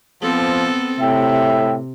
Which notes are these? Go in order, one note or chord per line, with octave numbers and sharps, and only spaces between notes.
F3 B3 C4 A4
A2 C3 E5 G5